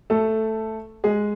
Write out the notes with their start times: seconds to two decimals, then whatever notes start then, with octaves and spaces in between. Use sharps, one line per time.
0.10 A3 A4
1.04 G#3 G#4